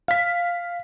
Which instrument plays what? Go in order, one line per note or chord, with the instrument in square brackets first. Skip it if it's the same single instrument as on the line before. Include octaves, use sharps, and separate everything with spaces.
[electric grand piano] F5 B6